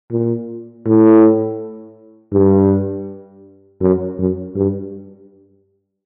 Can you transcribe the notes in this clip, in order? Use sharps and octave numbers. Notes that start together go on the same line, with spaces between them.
A#2
A2
G2
F#2
F#2
G2